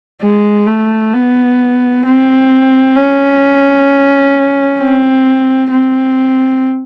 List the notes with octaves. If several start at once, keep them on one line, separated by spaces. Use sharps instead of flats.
G#3
A3
B3
C4
C#4
C4
C4